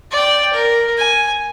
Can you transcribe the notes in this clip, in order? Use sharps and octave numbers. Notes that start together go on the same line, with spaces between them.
D5 G5
A#4
G#5